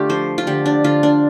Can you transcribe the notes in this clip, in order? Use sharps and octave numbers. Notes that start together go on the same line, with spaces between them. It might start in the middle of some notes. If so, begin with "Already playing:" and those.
Already playing: D3 A3 F4 G4
F3 C5
F4
D3 G4
D4
D3 F4
D4